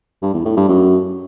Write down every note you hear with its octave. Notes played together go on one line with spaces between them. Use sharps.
G2
E2
A2
G2
F#2